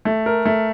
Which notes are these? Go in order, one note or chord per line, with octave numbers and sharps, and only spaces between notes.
A3
A#4
A3